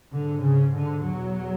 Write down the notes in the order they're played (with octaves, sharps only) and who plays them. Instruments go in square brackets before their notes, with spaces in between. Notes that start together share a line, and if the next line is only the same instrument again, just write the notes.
[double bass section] G#2 D3
C#3
D3
E2 B2 F#3